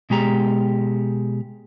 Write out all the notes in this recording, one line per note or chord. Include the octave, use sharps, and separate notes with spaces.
B2 G#3 G4 A#5